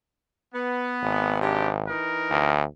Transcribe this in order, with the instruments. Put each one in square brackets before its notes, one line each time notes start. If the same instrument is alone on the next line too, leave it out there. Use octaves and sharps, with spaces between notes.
[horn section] B3
[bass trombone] G#1
[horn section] C3 D4 G4
E3 D#4 A#4
[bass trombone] D2